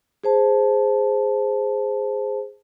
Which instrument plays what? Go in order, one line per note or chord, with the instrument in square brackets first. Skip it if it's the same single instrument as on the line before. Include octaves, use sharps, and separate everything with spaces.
[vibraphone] G#4 C5 A5